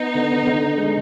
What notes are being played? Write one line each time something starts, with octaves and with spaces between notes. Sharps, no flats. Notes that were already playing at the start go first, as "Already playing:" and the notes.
Already playing: B3 D#4
D3
D3
G#3